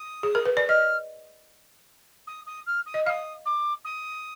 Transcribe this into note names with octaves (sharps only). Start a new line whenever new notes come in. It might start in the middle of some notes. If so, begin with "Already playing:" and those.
Already playing: D#6
G#4
A#4
B4
D5
D#5 F6
D#6
D#6
F6
D#6
D#5
F5 D#6 F6
D6
D#6